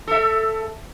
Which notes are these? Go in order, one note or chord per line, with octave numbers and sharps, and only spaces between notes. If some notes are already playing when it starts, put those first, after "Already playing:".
A4 E5